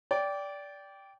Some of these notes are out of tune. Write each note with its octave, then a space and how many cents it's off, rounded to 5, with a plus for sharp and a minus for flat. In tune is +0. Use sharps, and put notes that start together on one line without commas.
D5 -20 G5 +0